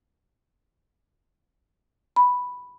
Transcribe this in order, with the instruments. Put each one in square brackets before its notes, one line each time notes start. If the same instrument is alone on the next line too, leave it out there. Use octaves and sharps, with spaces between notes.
[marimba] B5